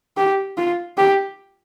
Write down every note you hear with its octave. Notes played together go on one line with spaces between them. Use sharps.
G4
F4
G4